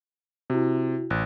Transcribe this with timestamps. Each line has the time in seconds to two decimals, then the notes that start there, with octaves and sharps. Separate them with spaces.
0.50 C3 E4 F#4
1.10 A1 F#6